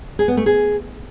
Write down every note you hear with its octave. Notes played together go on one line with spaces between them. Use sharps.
G#4
B3
A3
G#4